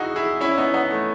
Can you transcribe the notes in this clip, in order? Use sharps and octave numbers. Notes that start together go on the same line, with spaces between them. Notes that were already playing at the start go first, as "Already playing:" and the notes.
Already playing: D#4 E4 F#4 G#4
E4 G#4
C#4 E4
C#4
B3 D#4
B3 D#4
A3